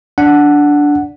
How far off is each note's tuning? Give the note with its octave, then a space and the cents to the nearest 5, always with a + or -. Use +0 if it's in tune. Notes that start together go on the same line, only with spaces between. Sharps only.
D4 -10 F#5 +0